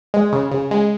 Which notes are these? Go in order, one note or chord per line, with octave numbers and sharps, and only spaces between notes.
G#3
C#3
C#3
G#3